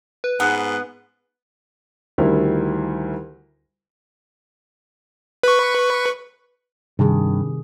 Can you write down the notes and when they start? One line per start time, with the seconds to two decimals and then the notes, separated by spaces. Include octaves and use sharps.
0.24 B4
0.40 G#2 B3
2.18 D2 D#3 G3 E4 A#4
5.43 B4 C#6
6.99 G2 C3 D#3 G#4